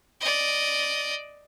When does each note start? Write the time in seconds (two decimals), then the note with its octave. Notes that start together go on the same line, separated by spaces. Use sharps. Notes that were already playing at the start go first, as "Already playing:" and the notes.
0.21 D5 D#5